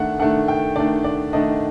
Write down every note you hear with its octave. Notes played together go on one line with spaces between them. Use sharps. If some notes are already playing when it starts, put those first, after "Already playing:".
Already playing: D#3 A3 D4 F#5
D#3 A3 D4 F#5
G5
D#3 A3 D4 D5
D5
D#3 A3 D4 D#5